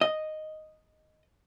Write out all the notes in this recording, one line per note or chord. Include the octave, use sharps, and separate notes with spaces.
D#5